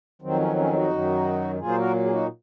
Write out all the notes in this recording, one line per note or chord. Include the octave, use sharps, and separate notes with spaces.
F2 D#3 F#3 C4
C#4
C#4
D#4 F#4
F#2 D#3 F#3
A#2 F#3 A#3 F4 G#4
C5
F#4 A#4
G#4
D#4 F#4